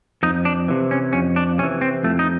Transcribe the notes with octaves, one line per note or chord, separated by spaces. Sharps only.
F2 D#4
D4
C3 E3
C#4
F2 C#4
D4
C3 C#4
E3
C4
F2 A3
D#4